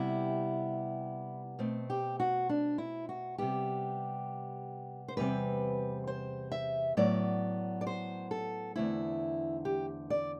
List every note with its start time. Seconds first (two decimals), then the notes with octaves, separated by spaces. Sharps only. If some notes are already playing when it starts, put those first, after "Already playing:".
Already playing: C3 G3 B3 E4
1.59 B2 A3 C4
1.90 G4
2.20 F#4
2.49 D4
2.78 E4
3.09 F#4
3.38 C3 G3 B3 G4
5.08 C5
5.17 E2 C3 G3 C4 B4
6.07 C5
6.52 E5
6.97 A2 F#3 B3 D5
7.81 D5
7.87 C5
8.31 A4
8.76 E2 D3 A3 C4 E4
9.65 G4
10.10 D5